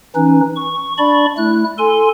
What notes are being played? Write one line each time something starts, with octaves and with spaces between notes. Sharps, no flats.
E3 C#4 D#4 B4
C#6
D4 D5 B5 C#6
A3 E4 F#6
A4 G#5 C6